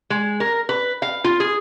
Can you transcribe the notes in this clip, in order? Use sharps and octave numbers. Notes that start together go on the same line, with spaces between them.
G#3
A#4
B4
F5
F4
G#4